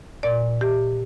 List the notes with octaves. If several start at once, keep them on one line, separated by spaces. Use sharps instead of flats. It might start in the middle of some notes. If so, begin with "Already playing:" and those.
A#2 D5
G4